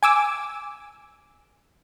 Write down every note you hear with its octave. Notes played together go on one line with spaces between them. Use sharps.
G#5 D6 E6